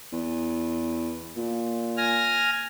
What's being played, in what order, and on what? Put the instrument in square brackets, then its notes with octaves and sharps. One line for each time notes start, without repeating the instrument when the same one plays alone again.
[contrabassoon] E2
A#2
[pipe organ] G#5 F6 A#6